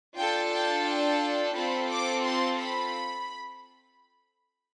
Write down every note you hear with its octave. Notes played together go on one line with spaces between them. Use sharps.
D4 F4 A4 G5
G5
G5
C4 F4 A4 B5
D6
C6
B5